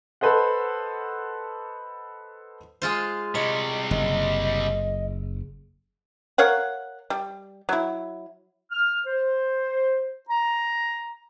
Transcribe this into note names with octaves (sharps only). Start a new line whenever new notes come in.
A4 B4 C5 D#5 F#5
G#3 F4 C5
C3 G3 C#5 D#5
F#1 D#5
A#4 C#5 F5 F#5
G3
F#3 E4
F6
C5
A#5